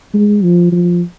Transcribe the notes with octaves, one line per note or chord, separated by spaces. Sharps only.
G#3
F3
F3